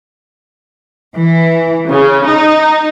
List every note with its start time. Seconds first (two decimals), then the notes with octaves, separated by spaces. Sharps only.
1.15 E3
1.90 C#3
2.26 D#4